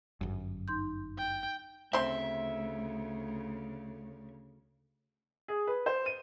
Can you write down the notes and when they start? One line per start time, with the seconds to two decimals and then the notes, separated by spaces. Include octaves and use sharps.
0.21 G1 F#2
0.68 D#4 C6 G6
1.18 G5
1.93 D2 C#3 C4 E5 C6
5.48 G#4
5.67 B4
5.86 C5
6.06 D#7